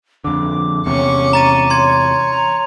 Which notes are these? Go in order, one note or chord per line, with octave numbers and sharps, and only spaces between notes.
F2 D3 D6
E2 C3 C#4 C#6
A#5 A6 D#7
C#5 C6 G#6
A#5